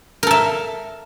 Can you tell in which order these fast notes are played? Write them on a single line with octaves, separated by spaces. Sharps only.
A#4 A4 E5